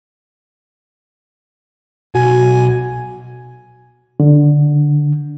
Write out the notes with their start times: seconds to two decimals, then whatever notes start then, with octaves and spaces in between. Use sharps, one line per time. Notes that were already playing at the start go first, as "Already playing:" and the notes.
2.15 B1 F#4 G#5
4.20 D3